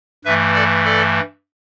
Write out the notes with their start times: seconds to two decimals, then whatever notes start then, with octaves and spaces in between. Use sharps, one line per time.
0.25 G2 E3 A3 B4 E5
0.54 A4 D5
0.84 A4 D5